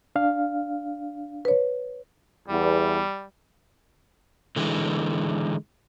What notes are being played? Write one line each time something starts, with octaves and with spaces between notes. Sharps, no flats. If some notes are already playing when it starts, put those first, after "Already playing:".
D4 F5
B4 C#5
E2 G3
D3 E3 G#3